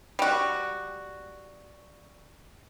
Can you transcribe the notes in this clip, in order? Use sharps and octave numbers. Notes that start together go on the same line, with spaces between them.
G3 F#4